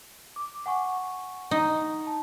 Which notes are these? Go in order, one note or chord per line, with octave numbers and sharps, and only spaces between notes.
D6
F#5 G#5 C#6
D#4
A5